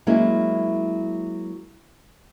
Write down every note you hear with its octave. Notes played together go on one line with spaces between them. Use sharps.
F#3 G#3 A#3 C#4 E4